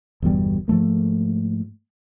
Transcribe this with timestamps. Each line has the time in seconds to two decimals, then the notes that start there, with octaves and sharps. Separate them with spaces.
0.22 G1 E2 B2 G3
0.68 G#2 F3 A3 A#3